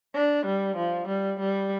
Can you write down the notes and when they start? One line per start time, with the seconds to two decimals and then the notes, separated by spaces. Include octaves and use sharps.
0.15 D4
0.46 G3
0.77 F3
1.08 G3
1.40 G3